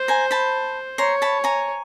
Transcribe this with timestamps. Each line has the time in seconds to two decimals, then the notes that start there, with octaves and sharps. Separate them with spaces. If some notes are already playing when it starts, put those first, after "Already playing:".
Already playing: C5
0.08 G#5 A#5
0.31 A5 B5
0.98 C#5 A#5 C6
1.22 A5 B5
1.44 G#5 A#5